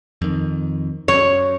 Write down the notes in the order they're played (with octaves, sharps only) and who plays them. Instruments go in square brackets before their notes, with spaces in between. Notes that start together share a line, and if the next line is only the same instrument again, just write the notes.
[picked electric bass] F2 D#3
[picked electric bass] F#2 [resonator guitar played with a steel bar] C#5